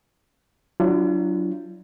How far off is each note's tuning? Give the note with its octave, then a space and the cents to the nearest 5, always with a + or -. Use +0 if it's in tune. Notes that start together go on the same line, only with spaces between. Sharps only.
F#3 +0 D4 +0 F4 -45